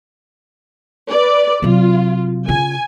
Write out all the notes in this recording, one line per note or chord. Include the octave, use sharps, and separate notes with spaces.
B4 D5
C3 F#3 F4
C#3 F4 G#5